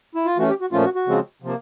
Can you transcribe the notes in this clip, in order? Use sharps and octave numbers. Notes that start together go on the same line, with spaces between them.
E4
F4
E3 A3 C#4 F#4
G4
F#4
A#2 F3 A3 C#4 F4
F#4
F#4
C#3 F3 G#3 C4
C3 F3 A#3